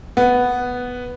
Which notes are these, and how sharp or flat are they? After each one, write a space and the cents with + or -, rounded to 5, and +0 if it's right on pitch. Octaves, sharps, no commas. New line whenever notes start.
B3 +0